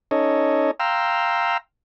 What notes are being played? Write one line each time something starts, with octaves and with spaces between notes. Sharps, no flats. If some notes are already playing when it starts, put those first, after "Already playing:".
C#4 D#4 A4 C#5 D#5
F5 G5 A#5 C6 E6